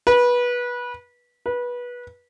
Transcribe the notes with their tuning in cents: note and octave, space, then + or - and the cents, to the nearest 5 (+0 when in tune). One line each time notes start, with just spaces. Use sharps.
B4 -20
B4 -20